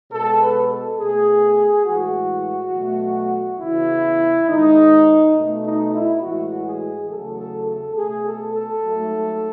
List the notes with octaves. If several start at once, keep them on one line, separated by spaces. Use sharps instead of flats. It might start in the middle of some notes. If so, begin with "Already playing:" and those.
B2 G#3 A4
B4
A4
B2 A3 G#4
A2 E3 G#3 F#4
B2 F#3 A3
E2 C#3 E3 E4
G#2 D#3 G#3 D#4
B2 A3
D#4
E4
A2 E3 G#3 F#4
G#4
E2 C#3 F#3 A3 A4
A4
A4
B2 A3 G#4
A4
A4
G#2 F#3 A3